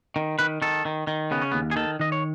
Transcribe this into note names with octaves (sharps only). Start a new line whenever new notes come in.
D#3
D#3 B4
D#3 A4
D#3
D#3
C#3 B3
C#4
D#2 B3
G#4
D#3 A4
D#3 D#5
C#5